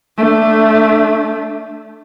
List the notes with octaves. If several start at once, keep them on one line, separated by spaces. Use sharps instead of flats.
A3 D4